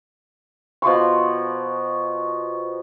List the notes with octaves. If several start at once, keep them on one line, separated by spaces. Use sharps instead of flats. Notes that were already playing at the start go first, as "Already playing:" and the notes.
B2 F3 C6 C#6